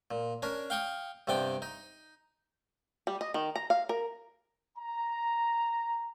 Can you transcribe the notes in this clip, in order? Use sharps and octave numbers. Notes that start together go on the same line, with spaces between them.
A#2
C#4 D4 A#4
F5 G5 C#6 D#6
G2 C3 B3 D5 G5
D#4
G3
D#5
D#3
A#5
F5
A#4
A#5